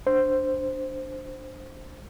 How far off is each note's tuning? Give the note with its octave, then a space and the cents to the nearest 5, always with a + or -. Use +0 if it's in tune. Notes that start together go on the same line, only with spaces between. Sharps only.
D4 +0 C5 +0